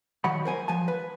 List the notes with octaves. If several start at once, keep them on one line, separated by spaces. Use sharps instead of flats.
D#3 F#3 F#5 B5
A#4 C5 G#5
F3 F#3 G#5 A5
B4